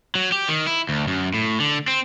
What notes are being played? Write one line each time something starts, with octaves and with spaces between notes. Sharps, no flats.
F#3
G4
D#3
E4
D2
F#2
A2
D3
C4